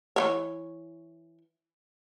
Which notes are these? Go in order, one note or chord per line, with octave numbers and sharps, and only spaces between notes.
E3 B3 C#5